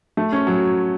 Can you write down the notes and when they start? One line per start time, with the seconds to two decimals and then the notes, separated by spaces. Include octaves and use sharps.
0.17 A3
0.32 C#4
0.47 F#3